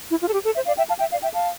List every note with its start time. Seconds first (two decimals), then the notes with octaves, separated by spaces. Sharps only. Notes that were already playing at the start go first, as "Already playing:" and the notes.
0.10 E4
0.21 F4
0.27 A4
0.32 G4
0.44 A4
0.55 C5 E5
0.66 D5 F5
0.77 E5 G5
0.89 F5 A5
0.99 E5 G5
1.11 D5 F5
1.22 E5 G5
1.34 F5 A5